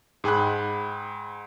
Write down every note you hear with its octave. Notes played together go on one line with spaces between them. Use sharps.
G#2 G#4 G5 B5 F#6